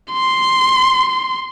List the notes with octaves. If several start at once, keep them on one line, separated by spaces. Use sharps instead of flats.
C6